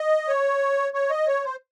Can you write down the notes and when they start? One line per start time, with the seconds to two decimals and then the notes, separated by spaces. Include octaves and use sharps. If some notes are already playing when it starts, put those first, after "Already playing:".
Already playing: D#5
0.28 C#5
0.94 C#5
1.10 D#5
1.28 C#5
1.44 C5